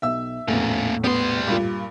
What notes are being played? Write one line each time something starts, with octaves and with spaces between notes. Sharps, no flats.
B1 E5 E6
A#1 E2 A2 A#3 C#4
G3 B3 C6
G2 A#2